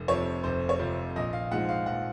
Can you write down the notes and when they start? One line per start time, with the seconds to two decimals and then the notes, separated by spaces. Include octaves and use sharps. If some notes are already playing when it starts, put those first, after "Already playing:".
Already playing: F1
0.08 F2 C3 F3 C#5
0.44 F1 C5
0.69 C#5
0.79 F2 C3 F3 C5
1.16 A#1 D#5
1.33 F5
1.51 G#2 F3 G#3 F#5
1.69 F5
1.86 A#1 F#5